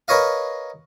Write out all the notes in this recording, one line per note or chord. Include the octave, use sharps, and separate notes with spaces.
A#4 B4 C#5 D#5 F5